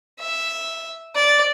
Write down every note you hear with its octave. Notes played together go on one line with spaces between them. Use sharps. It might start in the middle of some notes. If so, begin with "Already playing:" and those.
E5
D5